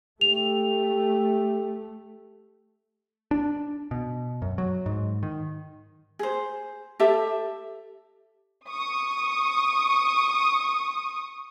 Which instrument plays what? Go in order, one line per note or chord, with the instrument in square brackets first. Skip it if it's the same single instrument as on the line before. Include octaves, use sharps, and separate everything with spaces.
[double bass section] A3 [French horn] G4 [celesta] F7
[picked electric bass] D4
B2
F#2
F#3
G#2
D#3
[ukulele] G#4 C5
G4 A4 E5
[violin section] C#6 D#6